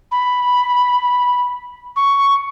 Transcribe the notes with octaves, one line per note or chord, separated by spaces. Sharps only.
B5
C#6